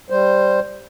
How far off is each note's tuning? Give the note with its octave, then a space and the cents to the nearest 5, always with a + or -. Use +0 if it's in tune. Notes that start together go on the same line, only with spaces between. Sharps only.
G3 +0 C5 +0